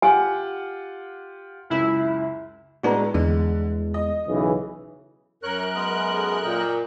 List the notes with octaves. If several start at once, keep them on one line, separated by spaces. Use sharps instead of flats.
F4 G4 F#5 G#5
C#2 F#2 E4
A2 G#3 B3 D4 F#4 A#5
E2 D3 G#3
D#5
B1 C#3 E3
F#2 A#4 C#5 F#6
G#3 B3 D#6
G#4 A4
A#2 D#5 G5